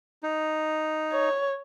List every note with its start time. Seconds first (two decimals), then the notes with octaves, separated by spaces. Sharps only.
0.23 D#4
1.12 C#5